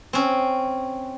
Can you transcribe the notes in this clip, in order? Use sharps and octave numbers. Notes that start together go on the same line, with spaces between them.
C4 C#4